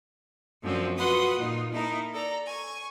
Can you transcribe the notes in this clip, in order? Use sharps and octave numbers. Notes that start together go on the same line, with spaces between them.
F#2 D3 F3 A3 C4 C#4
F4 F#4 B4 F#5 C6 D#6
A#2 D#4 F4
A#3 D#4 E4 A4 A#4
A4 D5 A#5
G#5 C#6